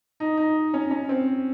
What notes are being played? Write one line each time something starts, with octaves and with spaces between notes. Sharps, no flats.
D#4
D#4
C#4
C#4
C4